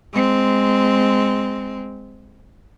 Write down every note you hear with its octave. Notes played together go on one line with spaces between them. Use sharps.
G#3 C4